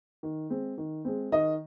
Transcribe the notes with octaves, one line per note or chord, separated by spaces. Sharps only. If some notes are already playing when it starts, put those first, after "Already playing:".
D#3
G#3 C4
D#3
G#3 C4
D#3 D#5